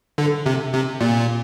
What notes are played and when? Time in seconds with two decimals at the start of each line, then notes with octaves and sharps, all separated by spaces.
0.18 D3
0.46 C3
0.73 C3
1.01 A#2